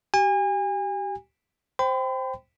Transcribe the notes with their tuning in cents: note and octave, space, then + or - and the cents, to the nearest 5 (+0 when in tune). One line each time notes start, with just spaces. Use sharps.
G4 -30 G#5 -35
C5 +0 G5 +0 B5 +45